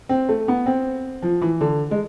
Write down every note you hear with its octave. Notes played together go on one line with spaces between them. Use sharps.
C4
A3
B3
C4
F3
E3
D3
G#3